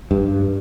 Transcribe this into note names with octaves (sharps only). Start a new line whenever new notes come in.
G2